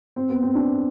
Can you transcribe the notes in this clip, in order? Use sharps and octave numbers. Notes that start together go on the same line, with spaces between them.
C4
B3
C4
D4